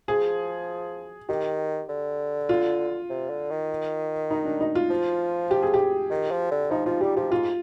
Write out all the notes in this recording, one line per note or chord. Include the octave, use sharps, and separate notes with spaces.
F3 G#4
D#3 G4
D3
F4
C3
D3
D#3
D#4
D4
D#4
F4
F3
G4
G#4
G4
D#3
F3
D3
F3 D#4
F3 F4
G3 G4
F3 G4
G#2 F4